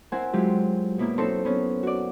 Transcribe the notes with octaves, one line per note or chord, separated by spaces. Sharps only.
C4 E4 A#4 C5 F#5 G#5
F#3 G#3 E4 F4 G4
F#2 B2 A#3 E4
C4 C#4 D#4 E4 A4 C5
B3 C#4
F#4 D5